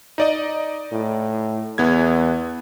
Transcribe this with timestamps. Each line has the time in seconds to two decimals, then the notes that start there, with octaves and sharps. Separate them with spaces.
0.18 D#4 D5 D#5
0.92 A2
1.78 E2 B3 G#6